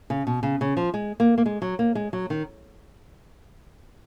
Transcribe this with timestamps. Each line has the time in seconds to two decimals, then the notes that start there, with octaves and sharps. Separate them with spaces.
0.10 C#3
0.27 B2
0.43 C#3
0.61 C#3
0.77 F3
0.94 G#3
1.20 A#3
1.38 A#3
1.46 G#3
1.62 F#3
1.79 A#3
1.95 G#3
2.13 F#3
2.30 D#3